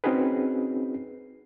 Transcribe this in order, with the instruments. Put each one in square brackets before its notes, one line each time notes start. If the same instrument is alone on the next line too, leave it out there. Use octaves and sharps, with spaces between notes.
[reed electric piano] C4 C#4 D#4 F#4 G#4 B4